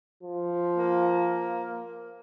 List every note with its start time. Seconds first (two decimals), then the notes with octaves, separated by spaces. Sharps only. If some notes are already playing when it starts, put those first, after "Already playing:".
0.23 F3
0.77 A#3